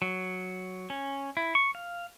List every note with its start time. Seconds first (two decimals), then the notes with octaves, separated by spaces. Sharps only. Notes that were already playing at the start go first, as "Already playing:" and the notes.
0.02 F#3
0.90 C#4
1.37 E4
1.55 C#6
1.75 F5